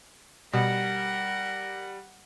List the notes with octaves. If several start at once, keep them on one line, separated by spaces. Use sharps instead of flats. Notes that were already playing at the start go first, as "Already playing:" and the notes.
B2 G3 A#4 F#5